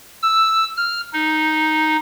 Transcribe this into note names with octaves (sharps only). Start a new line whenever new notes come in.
E6
F6
D#4